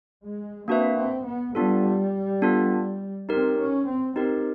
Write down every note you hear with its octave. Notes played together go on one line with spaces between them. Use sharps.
G#3
A#3 C4 D4 F#4 B4 E5
C4
B3
G3 B3 D4 F4 A4
B3 D4 F4 A4
C4 D#4 G4 A#4
C#4
C4
C4 D#4 G4 A#4